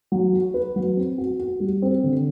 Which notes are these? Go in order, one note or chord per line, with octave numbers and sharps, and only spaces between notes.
F#3
F#4
B4
F#3
C4
F#4
F#4
G3
C4
D3